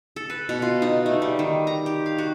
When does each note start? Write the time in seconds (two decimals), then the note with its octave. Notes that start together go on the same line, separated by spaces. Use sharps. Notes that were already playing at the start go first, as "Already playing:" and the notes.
0.16 A4
0.30 B4
0.49 B2
0.62 F4
0.82 D#4
1.06 A3
1.22 G3
1.39 D#3
1.67 A#5
1.86 G4
2.06 F5
2.18 F#4